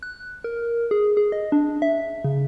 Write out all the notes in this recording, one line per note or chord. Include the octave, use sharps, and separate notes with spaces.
F#6
A#4
G#4
G#4
D#5
D4
E5
C#3